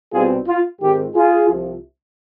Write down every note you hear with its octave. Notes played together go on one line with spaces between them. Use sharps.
C2 B2 G3 C4 D#4 F4 G#4
F4
G#2 D#3 G#3 C4 F4 G4
F4 G#4
C2 C3 F3